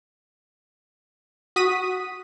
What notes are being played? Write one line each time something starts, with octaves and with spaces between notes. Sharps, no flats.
F#4 D#6 B6 D#7